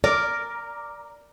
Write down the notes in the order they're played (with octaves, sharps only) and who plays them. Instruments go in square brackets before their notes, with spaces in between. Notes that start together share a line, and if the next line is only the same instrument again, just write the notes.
[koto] A#4 [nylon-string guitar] D5 [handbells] D6 F6